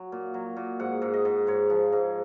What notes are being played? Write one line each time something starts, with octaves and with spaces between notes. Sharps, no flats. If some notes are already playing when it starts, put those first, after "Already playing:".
Already playing: F#3
A#2
F#3
A#2
G#2 F#5
G#2
D#5
G#2
G#2 C#5
F3
G#2